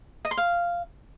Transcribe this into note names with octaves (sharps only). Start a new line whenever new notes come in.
D#5
C6
F5